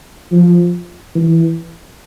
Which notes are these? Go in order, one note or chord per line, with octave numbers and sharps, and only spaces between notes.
F3
E3